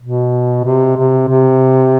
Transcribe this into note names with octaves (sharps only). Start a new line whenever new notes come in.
B2
C3
C3
C3